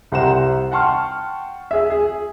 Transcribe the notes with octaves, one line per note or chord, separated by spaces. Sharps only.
C2 G4 C5 F#5 A#5 E7
F#5 G5 A5 C6 C#6 F6
G#4 E5
G#4